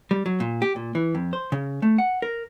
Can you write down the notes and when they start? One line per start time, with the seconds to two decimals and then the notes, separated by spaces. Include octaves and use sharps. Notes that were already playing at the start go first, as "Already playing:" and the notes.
0.11 G3
0.26 F#3
0.40 A#2
0.62 G4
0.76 A#2
0.95 E3
1.15 F2
1.33 C5
1.52 C#3
1.82 A3
1.98 F#5
2.22 A#4